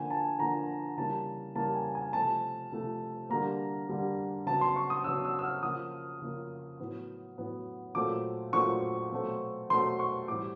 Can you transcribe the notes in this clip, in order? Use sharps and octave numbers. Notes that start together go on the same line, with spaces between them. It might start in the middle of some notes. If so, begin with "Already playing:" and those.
Already playing: D3 F3 A#3 G#5
A5
D3 F3 A#3 A#5
C#3 E3 G3 A#3 A5
C#3 E3 G3 A#3 A5
G#5
G#5
C3 F3 A3 A5
C3 F3 A3
D3 G3 A#3 A#5
D3 G3 A#3
C#3 F#3 B3 A5
C6
C#6
D#6
C#3 F#3 B3 E6
E6
E6
F6
C#3 F3 A#3 D#6
C#3 F3 A#3
A2 F#3 B3
A2 F#3 B3
A#2 F#3 A3 C4 D6
A#2 F#3 A3 C4 C#6
B2 F#3 A3 C4
B2 F#3 A3 C4 C6
C#6
A2 E3 G3 C4 D6